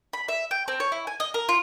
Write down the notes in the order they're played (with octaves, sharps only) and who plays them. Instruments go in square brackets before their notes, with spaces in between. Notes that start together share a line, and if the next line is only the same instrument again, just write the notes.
[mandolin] B5
E5
G5
C4
C#5
E4
G#5
D#5
A#4
F4